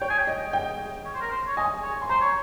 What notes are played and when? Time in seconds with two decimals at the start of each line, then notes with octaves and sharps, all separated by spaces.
0.01 C#5 G5
0.10 G#5
0.19 G5
0.27 D#5
0.53 G5
1.05 C#5
1.14 C5
1.21 A#4
1.31 C5
1.47 C#5
1.57 D#5 G#5
1.83 C#5
2.02 C6
2.09 C5 A#5
2.21 C#5